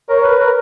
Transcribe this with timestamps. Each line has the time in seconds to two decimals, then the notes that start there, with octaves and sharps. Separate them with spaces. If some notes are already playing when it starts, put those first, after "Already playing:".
0.09 A#4 C#5
0.24 B4
0.40 A#4